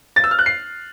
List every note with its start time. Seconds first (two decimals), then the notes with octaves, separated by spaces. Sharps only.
0.16 A6
0.24 E6
0.31 F6
0.39 F#6
0.46 C7